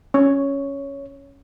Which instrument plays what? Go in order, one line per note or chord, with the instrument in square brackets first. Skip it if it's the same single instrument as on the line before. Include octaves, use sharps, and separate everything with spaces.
[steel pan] C#4 [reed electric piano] C#5